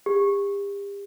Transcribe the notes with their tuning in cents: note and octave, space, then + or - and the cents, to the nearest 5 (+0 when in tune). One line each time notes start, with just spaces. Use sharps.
G4 +40